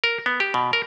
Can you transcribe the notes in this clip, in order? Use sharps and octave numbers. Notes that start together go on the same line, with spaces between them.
A#4
B3
G4
B2
A#4